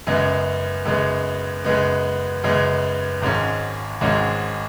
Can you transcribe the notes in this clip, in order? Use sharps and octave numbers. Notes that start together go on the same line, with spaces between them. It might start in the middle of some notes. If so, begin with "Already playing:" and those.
F#2 C#3 G#3 B3
F#2 C#3 G#3 B3
F#2 C#3 G#3 B3
F#2 C#3 G#3 B3
G#1 G#2 G#3 C#4
G#1 G#2 G#3 C#4